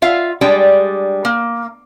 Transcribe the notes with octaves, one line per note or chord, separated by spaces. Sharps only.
F4 E5 F5
G3 G#3 D4 G4 G5
A#3